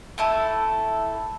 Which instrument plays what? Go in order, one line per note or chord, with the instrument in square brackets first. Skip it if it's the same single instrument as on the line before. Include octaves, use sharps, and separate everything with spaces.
[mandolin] A3 E4 A4